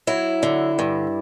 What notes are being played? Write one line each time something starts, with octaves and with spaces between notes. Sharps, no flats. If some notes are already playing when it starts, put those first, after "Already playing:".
F#3 E4
D3
G2